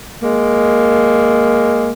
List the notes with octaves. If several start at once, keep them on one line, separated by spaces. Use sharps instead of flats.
G#3 A#3